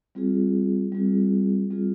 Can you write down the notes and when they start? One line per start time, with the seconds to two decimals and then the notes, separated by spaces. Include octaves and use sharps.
0.15 G3 C4 F4 G#4
0.92 G3 C4 F4 G#4
1.70 G3 C4 F4 G#4